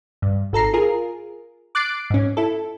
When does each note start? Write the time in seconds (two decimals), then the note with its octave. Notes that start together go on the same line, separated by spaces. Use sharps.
0.22 G2
0.53 G#1 A4 A#5 C7
0.73 F4 G#4 A#4
1.75 D6 F#6 A6 C7 D7
2.10 G#2 C#4
2.37 E4 A4